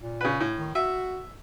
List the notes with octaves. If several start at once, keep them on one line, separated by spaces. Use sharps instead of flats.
A#2
C#3 B4
A2
D#3
F#4 E5